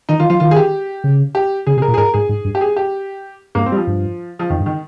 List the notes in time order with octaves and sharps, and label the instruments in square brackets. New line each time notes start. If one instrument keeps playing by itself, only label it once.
[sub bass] D#3 [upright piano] D#4
[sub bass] D#3 [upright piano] F4
[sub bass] F3 [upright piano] F4
[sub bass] D#3 [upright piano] F4
[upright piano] G#4
G4
[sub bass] C#3
[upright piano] G4
[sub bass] C#3 [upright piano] G#4
[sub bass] C3 [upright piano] G#4
[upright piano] A#4
[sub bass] A#2
[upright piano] G#4
[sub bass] G#2 [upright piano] A#4
[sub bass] G#2 [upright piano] G#4
[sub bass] G#2
G2
[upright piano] G4
G#4
G4
[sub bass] G2 [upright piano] A#3
[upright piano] C4
G3
F3
[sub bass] G2
[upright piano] F3
[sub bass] F2 [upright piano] D#3
[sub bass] G2
[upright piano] D#3